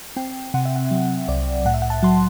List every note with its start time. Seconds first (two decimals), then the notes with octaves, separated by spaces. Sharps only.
0.16 C4 G5
0.54 C3 F#5
0.65 E5
0.76 F#5
0.91 F#3
1.28 C2 D5
1.65 A2 F#5
1.74 E5
1.82 F#5
1.90 A5
2.03 F#3 C6